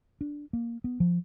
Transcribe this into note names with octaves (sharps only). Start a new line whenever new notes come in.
D4
A#3
B3
F3